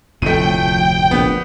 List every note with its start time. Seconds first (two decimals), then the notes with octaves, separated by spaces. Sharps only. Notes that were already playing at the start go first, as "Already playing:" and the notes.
0.22 F1 D2 A2 F3 A3 G5 D#7
1.11 A#1 B3